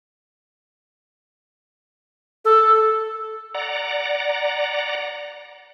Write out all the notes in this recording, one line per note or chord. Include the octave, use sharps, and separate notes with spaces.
A4
D5 F#5 A#5